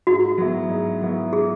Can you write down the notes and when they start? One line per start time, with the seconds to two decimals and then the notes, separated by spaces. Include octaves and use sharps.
0.07 G#2 F#4
0.38 F#3 B3 E4
0.70 G#2
1.02 F#3 B3 E4
1.33 G#4